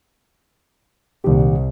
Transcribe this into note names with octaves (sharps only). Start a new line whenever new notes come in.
C2 A#2 D#3 G4